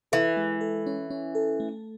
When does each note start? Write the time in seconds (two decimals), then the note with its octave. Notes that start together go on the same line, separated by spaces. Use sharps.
0.12 E3 A4
0.37 G#3
0.61 A4
0.87 C#4
1.10 C#4
1.35 A4
1.60 A3